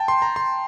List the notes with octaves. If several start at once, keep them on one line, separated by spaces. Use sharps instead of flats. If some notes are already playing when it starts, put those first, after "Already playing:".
Already playing: G5 A5
C6
A#5
C6